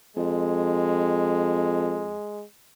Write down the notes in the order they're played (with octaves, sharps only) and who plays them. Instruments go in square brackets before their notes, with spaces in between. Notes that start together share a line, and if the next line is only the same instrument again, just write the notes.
[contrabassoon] F2 [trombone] G#3